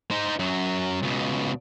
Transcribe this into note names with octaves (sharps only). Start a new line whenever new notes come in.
D#4 C5
F#2 F#3
C#2 B2